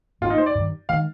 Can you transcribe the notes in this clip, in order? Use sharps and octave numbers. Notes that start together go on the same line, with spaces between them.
G#1 G#2 D#3 A#3 F4
D#4
C5
D5
G2 D#3 G3
D#3 G#3 F5